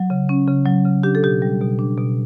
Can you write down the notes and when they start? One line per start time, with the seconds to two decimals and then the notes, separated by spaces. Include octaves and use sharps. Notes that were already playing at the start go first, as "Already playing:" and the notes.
Already playing: F#3
0.10 C#3
0.29 C#4
0.47 C#3
0.66 F#3
0.85 C#3
1.03 D4 G4
1.15 A4
1.23 B2 G4
1.42 G3
1.61 B2
1.79 D4
1.98 B2